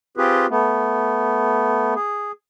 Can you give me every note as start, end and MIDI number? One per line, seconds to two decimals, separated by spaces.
0.17 0.46 60
0.17 0.46 65
0.17 0.46 67
0.17 0.46 68
0.17 0.46 71
0.50 1.94 57
0.50 1.94 59
1.95 2.32 68